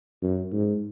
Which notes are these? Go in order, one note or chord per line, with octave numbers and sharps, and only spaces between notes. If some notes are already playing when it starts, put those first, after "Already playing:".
F#2
G#2